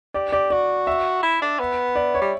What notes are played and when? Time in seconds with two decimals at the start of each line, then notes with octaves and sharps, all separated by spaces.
0.14 G4 D5
0.32 G4 D5
0.50 F#4 D5
0.87 E5
1.23 E4
1.42 D4
1.60 B3
1.96 D5
2.14 C#5
2.21 G3